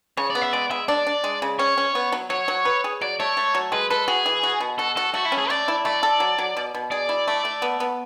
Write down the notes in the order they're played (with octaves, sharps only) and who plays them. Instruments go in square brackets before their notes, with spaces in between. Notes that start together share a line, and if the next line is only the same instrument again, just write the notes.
[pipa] C#3 [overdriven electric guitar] C#5
[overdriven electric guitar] D5
[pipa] B3
[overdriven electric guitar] E5
[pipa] G#3 [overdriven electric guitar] D5
[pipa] G#3 [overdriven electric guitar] E5
[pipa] D4 [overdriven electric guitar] D5
[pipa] D4
G#3
C#3
[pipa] C#4 [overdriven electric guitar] C#5
[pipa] C#4
B3
F#3
[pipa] F#3 [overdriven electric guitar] C#5
[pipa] F#3
B4
G#4
[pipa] F#3 [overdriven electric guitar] D5
[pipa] A3 [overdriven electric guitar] C#5
[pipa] A3
F#3
[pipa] G#3 [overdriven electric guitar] B4
[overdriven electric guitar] A4 [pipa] B4
[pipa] F#4 [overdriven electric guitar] G#4
[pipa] E3
F#4
B2
[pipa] F#4 [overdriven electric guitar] A4
[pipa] F#4 [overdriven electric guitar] A4
[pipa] A3 [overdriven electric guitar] F#4
[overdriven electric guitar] E4
[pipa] C#4
[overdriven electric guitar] G#4
[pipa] A3 [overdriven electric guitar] D5
[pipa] E4
[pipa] A3 [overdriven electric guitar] D5
[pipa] A4
F#3
F#3
B2
B2
[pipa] G#4 [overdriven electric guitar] D5
[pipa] E4
A3
A3
B3
B3